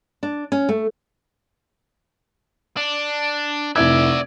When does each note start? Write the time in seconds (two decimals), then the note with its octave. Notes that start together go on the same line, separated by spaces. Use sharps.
0.23 D4
0.52 C#4
0.69 A3
2.77 D4
3.76 F1 E4 D5 E5 G#6